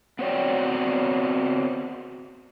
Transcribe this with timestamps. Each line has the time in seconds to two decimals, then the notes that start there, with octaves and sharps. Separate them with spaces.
0.19 B3 C4 F#4 C#5 D5 G5